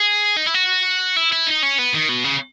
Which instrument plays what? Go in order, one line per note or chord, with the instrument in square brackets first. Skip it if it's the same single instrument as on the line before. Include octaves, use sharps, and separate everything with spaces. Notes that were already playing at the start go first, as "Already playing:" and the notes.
Already playing: [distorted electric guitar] G#4
D#4
E4
F#4
E4
E4
D#4
C#4
B3
D#3
B2
C#3